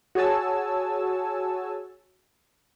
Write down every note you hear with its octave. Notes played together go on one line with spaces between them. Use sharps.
F#4 G#4 C#5 G#5 A5 E6